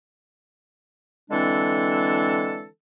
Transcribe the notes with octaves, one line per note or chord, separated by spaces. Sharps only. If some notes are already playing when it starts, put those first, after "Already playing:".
D3 E3 G#3 C4 D4 A4